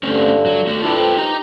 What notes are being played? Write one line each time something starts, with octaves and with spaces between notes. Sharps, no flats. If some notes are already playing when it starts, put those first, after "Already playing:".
G2 D3 A3 C4 C#4
F#3
A3 F#4 A4
D4 E4 F4 A4 B4 G5
C4 A4
D#4 G4 A#5